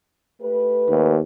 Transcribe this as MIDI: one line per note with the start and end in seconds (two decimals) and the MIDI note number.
0.41 1.20 57
0.41 1.20 67
0.41 1.20 71
0.89 1.21 39